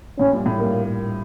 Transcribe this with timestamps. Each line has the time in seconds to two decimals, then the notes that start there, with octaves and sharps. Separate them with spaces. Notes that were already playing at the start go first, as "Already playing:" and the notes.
0.19 A2 C#4
0.32 G2 A#2
0.46 A2
0.58 G2 A#3